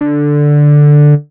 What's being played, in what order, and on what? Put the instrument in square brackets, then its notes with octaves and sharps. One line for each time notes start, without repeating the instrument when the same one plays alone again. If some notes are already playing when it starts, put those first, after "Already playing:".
[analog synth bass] D3